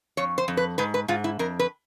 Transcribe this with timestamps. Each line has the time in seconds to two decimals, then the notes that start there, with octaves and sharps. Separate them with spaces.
0.17 F2 C#5
0.38 C5
0.48 F2
0.57 B4
0.78 G#2 B4
0.94 B4
1.08 G#2 F4
1.24 E4
1.39 F2 A#4
1.59 B4